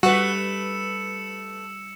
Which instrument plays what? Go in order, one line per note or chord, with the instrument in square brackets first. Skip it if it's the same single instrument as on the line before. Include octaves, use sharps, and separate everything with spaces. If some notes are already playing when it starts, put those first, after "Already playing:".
[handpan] G3 [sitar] A3 B4 [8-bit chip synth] F#4 [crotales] E6 C#7 E7